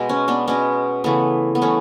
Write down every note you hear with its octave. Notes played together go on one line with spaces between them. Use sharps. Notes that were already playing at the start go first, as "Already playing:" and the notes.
Already playing: B2 G#3 B3
C#4
B3 D4
B2 G#3 B3 C#4
C#3 E3 A3 B3
B3
C#3 E3 A3 C#4